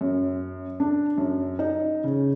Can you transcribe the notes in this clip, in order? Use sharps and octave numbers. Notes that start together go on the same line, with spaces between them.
F#2
D4
F#2
D#4
C#3